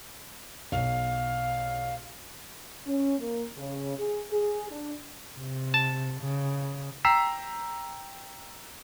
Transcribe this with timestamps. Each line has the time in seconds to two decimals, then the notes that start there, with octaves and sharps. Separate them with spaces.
0.72 B1 F5
2.85 C#4
3.19 A#3
3.58 C#3
3.97 G#4
4.31 G#4
4.71 D4
5.38 C3
5.74 A5
6.21 C#3
7.05 G5 A#5 E6 B6 C7 E7